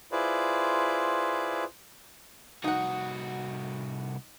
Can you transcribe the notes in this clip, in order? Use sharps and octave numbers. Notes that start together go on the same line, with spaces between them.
E4 F4 G#4 B4 C5 D5
C2 D#4 F#4 F#5